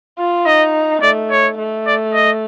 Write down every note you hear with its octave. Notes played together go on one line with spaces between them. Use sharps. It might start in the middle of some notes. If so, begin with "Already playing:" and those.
F4
D#4 D#5
A3 D5
C#5
A3
D5
D#5